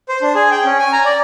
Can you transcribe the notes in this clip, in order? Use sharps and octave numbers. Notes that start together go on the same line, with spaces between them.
C5
D4
G#4
G5
C#4
G#5
A#5
D5